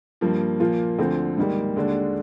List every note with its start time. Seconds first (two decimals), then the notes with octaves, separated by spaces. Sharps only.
0.21 G2 F3 A#3
0.60 A#2 F3 A#3 F4
0.99 D2 D3 F3 C4
1.38 G#2 D#3 G3 A#3
1.76 D#2 D3 G#3 D4